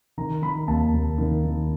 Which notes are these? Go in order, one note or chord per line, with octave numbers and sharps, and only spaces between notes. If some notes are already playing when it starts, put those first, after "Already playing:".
D#3 A#5
D#3 B5
D#2 A5
D#2
D#3
D#3